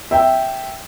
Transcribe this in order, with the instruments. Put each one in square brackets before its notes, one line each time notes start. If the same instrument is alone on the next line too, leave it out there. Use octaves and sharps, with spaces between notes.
[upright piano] E5 G5